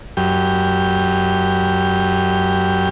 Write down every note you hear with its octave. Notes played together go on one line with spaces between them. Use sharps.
F#2 G4